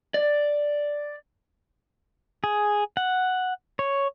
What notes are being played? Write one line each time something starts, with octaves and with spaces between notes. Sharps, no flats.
D5
G#4
F#5
C#5